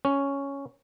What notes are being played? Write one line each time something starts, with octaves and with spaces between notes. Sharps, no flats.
C#4